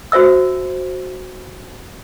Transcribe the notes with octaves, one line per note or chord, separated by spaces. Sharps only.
F#4 C5 E5 E6